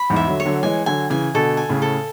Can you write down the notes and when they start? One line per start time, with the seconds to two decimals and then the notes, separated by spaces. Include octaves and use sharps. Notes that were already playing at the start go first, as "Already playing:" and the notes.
Already playing: B5
0.10 E2 G#2
0.16 E5
0.27 D3 F#3
0.40 C#5
0.45 D3 F#3
0.63 E3 G#3 G#5
0.86 D3 F#3 G#5
1.10 C#3 E3 G#5
1.34 B2 D3 A4
1.57 G#5
1.69 A2 C#3
1.82 A4